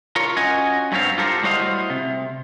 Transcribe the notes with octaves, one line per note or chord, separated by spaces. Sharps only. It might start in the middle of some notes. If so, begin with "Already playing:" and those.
F4 A#4 C#5
C#4 F4 F#4 D#5 G#5
G2 F#3 B3 C4 F5
F4 G4 A4 A#4 C5
A2 G3 F#4 C5 D#5 F5
C3